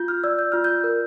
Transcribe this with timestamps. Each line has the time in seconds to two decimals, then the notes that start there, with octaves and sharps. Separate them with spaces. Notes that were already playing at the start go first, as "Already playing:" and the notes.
Already playing: F4 G6
0.08 F6
0.24 D5 E6
0.39 G6
0.52 F4 F6
0.64 G6
0.84 A#4